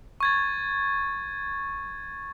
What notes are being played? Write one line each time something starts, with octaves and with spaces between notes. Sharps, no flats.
C#6 G#6 A6